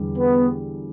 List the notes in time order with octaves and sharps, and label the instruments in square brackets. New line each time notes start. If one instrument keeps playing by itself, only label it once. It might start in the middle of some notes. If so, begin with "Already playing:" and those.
Already playing: [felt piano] E2 D3 G3
[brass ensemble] B3